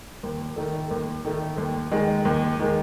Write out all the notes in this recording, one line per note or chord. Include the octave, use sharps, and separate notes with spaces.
D#2
D#3 A3
D#2
D#3 A3
D#2
D#3 G#3
D#2
D#3 G#3